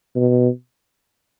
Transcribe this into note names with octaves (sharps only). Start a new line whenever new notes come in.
B2